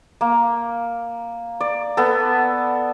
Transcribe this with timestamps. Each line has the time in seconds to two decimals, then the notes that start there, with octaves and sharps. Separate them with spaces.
0.21 A#3
1.60 D5
1.97 B3 A4